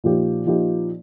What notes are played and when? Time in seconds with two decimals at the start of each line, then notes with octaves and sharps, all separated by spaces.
0.04 A#2 F3 D#4 G4
0.46 A#2 F3 D#4 G4